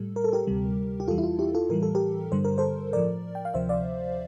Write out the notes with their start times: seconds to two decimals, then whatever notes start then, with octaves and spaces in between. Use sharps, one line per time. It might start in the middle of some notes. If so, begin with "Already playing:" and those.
Already playing: A2 G3 A4
0.16 A#4
0.24 A4
0.33 G4 A#4
0.47 D2 C3 G3
1.00 G4
1.08 E2 E3 G3 F4 A4
1.18 E4
1.24 F4
1.39 E4 G4
1.55 F4 A4
1.69 A2 E3 G3 A#4
1.83 A4
1.95 G4 A#4
2.32 G2 D3 G3 C5
2.45 A#4
2.58 A4 C5
2.93 A2 F3 A#4 D5
3.35 G5
3.45 F5
3.54 D2 C3 F3 C5 E5
3.69 D5 F5